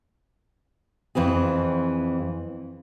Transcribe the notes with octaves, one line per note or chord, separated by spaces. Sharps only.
F2 E3 C4 G#4